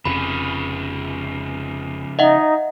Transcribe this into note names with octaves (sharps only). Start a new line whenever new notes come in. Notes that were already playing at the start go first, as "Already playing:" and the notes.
F1 F2 C#3 F3 B5
D#4 D#5 E5 F#5